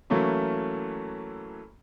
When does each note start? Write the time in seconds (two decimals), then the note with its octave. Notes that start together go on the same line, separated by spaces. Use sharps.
0.10 E3 F#3 A3 A#3 C#4 E4